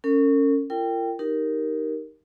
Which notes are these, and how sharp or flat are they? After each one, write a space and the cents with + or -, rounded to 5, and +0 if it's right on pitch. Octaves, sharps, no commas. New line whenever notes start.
C#4 +0 A#4 -45
F4 -40 A#4 -30 G5 +0
D#4 +0 G4 -10 A#4 +0